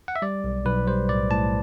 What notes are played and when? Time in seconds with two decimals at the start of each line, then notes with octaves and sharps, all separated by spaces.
0.08 F#5
0.16 E5
0.22 G3 D5
0.44 B1
0.66 B1 B4
0.87 G3 C5
1.09 A2 D5
1.31 A2 A5